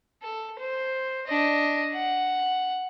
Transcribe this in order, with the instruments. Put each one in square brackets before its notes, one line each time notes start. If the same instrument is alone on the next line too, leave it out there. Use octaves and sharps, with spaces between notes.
[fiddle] A4
C5
D4 D#5
F#5